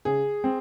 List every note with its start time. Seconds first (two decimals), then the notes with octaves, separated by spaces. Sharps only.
0.05 C#3 G#4
0.44 C4